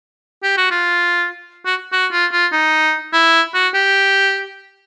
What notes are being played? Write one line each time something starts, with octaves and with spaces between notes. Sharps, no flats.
G4
F#4
F4
F#4
F#4
F4
F4
D#4
E4
F#4
G4